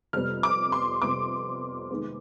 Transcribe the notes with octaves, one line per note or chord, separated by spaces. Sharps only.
F2 C3 G3 B3 F6
D6
C6
F2 C3 G3 B3 D6
D#2 D#3 G#3 B3